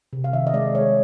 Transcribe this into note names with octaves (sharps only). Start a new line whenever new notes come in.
C3
F5
D#3 E5
D#5
G#3 D5
G#3 C#5